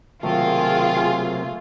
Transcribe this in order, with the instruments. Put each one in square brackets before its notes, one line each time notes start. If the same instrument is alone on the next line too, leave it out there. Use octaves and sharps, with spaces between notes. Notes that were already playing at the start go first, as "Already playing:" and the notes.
[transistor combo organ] C3 F#3 A#3 [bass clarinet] D#3 [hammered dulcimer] A3 [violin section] F4 G#4